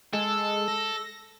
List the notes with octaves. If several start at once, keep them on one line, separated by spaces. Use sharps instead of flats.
G#3 A4
A#6